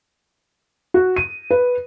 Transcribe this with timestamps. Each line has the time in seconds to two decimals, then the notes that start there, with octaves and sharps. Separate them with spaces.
0.94 F#4
1.16 D#7
1.51 B4